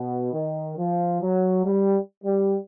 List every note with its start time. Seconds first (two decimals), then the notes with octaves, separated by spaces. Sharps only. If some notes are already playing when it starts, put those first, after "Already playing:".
Already playing: B2
0.32 D#3
0.76 F3
1.21 F#3
1.65 G3
2.24 G3